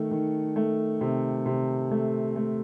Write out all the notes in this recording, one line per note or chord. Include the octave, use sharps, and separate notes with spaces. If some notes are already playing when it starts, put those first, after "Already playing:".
Already playing: D#3 A3
D#3
A3
C3
C3
A3
A3